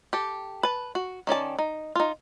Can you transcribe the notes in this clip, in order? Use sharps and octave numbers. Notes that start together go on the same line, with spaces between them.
G4 A4
B4 A5
F#4
D#3 C#4 D5 A5
D#4
D#4 F4